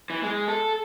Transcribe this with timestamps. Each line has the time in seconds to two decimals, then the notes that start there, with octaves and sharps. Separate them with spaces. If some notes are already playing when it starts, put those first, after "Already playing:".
0.10 E3
0.23 G#3
0.48 A4